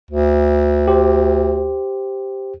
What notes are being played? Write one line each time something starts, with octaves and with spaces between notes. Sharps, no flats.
D2
G4 C5